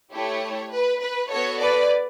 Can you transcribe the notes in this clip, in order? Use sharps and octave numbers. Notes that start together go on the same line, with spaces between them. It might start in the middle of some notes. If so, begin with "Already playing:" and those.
A3 E4 G4 C#5
B4
B4
B3 F#4 A4 C#5
B4 D5